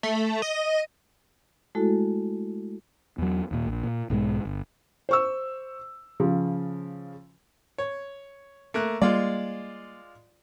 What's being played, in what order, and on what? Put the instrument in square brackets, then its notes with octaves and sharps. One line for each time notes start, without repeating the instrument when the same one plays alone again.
[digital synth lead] A3
D#5
[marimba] G#3 A3 E4 F#4 A4
[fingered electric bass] E2 F#3
D#2 A#2
A#1
A#2
B1 G#2 F#3 G#3
G1
[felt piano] C5 C#6 E6
C#3 F3
[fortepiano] C#5
A3 A#3 F#6
[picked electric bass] G3 A#3 [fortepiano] G#3 F4 D5